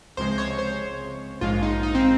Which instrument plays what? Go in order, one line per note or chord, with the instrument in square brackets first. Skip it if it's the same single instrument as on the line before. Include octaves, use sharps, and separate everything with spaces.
[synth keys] C#2 C3 F3 G#3 C5
C5
C#5
C5
A#1 G#2 F3 G#3 F4
D#4
D#4
C4